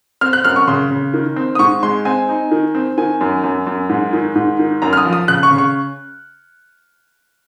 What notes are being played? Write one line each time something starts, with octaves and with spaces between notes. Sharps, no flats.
C4 F6
F#6
F#2 F6
C#6
C#3 C6
C#3
D#3
C4
D#6
G#2 C#6
G#3 C6
C4 G#5
D#4
D#3
C4
D#3 G#5
F#2
F#2
F#2
G#2
D#3
G#2
D#3
F#2 A#5
F6
D#6
F3
D#6
C#3 F#6
C#6
C#3
C#6